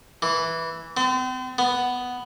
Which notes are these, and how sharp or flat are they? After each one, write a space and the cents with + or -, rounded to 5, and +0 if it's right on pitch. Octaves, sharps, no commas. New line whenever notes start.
E3 -5
C4 -40
B3 +5